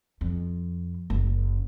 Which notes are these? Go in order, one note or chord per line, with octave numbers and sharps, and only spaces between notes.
F2
F#1